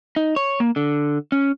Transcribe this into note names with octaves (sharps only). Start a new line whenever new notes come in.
D#4
C#5
A#3
D3
C#4